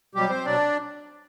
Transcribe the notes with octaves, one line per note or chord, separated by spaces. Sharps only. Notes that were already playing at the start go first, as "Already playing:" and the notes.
B2 F#3 G3 G4
C4 C5
B2 F#3 D4 D5